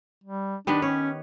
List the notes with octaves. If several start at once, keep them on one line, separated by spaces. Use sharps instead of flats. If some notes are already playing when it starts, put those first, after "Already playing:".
G3
D#3 B3 D4 G4
C#4 C#5